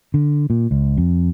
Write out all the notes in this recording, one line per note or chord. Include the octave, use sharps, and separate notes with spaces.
D3
A#2
C#2
F2